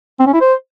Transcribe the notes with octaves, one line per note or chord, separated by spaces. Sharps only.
C4
C#4
E4
C5